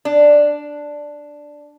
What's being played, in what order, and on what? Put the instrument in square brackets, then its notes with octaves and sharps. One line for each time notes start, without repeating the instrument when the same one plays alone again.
[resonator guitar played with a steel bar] D4